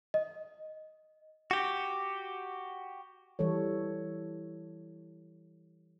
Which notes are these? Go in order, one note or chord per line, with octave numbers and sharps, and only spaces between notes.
D#5
F#4 G4
E3 G3 A4 C#5